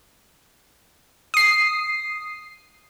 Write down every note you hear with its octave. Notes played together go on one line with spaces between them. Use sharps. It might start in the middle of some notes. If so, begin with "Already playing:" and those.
D#6 C7